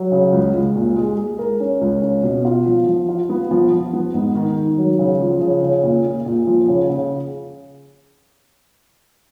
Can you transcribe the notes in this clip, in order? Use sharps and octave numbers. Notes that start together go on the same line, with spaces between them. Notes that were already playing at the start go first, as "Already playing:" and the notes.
Already playing: F#3
C#3
C#2
C#2
A#2
G#3
G#3
A#4
C#4
C#2
C#4
B2
F4
F3
F3
F4
B3
F3
F3
B3
G#2
D#3
D#3
F#3
C#3
F3
C#3
C#3
A#2
A#2
A#2
F3
C#3
C#3